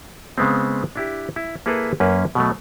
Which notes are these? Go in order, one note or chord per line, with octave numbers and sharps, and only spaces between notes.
C#3 G#3 B3 C4
D4 E4 G4
E4
A#3 E4 G#4 A4 B4 A#5
F#2 A#3 C#4 B4
B2 F#3 A3